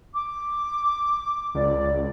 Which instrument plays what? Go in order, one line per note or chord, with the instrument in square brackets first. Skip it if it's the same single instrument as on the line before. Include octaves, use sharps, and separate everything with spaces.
[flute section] D6
[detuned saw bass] C#2 [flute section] D5